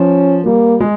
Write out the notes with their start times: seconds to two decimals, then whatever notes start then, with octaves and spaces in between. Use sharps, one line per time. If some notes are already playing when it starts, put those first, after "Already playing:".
Already playing: F3 C#4
0.45 G3 A#3
0.80 G#3